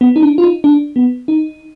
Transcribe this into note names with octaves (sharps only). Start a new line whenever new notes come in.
B3
D#4
D4
F4
D#4
D4
B3
D#4